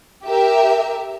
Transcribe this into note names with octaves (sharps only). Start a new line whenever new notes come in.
G4 A#4 E5